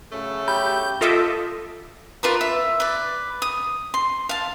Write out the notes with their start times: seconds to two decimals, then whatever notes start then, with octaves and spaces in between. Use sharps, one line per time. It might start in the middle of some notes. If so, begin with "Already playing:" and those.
0.12 C#3 F#3 A3
0.48 G4 B5 G6
1.01 F4 A4 D#5 E5 D6
2.23 F4 A#4 B4 D5
2.41 E5
2.80 B4 D5
3.42 D#6
3.94 C6
4.29 F5 A5